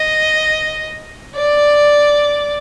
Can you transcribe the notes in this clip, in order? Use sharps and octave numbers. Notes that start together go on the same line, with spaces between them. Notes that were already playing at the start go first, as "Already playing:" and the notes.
Already playing: D#5
D5